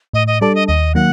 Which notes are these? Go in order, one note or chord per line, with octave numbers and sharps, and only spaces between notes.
A2 D#5
D#5
G3 D4 A4 D5
D#5
D#2 D#5
D#3 F#3 A#3 F#5